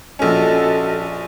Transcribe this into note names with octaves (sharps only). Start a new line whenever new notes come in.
A#1 C#4 F#4 A4 D#5